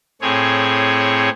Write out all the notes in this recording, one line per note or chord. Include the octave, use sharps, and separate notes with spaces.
A2 C4 G#4 C#5